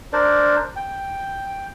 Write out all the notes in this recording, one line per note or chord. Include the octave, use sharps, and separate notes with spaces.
D4 A#4 C5 D5
G5